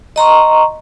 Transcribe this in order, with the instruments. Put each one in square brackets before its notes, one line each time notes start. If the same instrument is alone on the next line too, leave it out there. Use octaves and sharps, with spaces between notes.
[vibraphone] D#5 A#5 C6 C#6